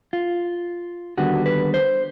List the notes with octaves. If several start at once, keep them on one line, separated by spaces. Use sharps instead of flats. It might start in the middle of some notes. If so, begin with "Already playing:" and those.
F4
D#2 D3 G3 B3 F#4
B4
C5